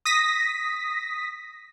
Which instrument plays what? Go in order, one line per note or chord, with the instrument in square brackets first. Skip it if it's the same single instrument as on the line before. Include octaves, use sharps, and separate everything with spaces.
[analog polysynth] D#6 A#6 B6